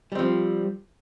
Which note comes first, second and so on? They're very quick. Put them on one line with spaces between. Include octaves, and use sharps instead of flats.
G3 C4 F3